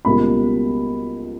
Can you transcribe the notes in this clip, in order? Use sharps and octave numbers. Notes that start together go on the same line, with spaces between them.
C#2 B2 G3 A#3 B5